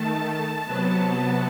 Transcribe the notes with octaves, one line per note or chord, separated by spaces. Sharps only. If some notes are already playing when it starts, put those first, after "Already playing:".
Already playing: D#3 A3 A5
A5
C3 F#3 B3